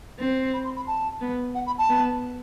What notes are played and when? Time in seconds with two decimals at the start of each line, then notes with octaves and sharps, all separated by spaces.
0.19 C4
0.54 B5
0.65 C6
0.76 B5
0.87 A5
1.21 B3
1.55 F#5
1.67 B5
1.78 A5
1.89 B3